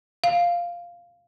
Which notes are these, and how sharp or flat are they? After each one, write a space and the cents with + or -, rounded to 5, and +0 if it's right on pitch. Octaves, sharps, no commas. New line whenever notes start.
F5 -5